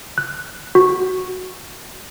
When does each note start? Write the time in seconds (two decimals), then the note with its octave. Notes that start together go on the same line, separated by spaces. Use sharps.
0.18 F#6
0.75 F#4